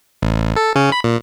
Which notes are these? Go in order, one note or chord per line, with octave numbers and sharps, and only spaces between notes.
A1
A4
C#3 C#4
B5
A#2